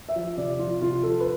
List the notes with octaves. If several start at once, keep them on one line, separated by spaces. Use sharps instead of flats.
E5
F3
C3 D5
F3 F4
C3 F4
F3 A4
B4